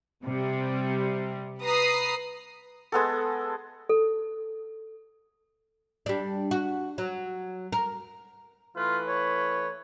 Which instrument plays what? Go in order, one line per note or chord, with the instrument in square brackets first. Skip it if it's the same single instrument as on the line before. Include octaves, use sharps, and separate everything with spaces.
[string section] C3 G3
B4 A#5 D#6 C7
[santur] G#3 B3 A4
[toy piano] A4
[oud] G3 D4
F#4
F#3
A#4
[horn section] E3 A3 B4 [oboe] F4
[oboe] C#5